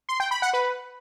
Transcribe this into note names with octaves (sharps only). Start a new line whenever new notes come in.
C6
G5
B5
F#5
B4